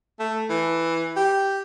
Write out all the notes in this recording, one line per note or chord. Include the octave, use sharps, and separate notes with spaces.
A3
E3
G4